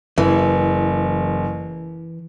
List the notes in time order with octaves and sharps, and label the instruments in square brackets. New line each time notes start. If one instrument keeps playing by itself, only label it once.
[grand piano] F#1 [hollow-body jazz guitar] E3